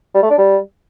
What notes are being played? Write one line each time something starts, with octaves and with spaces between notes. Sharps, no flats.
G3
A3
D4
G3